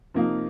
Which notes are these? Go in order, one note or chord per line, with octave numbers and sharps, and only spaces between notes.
C3 F3 A#3 D#4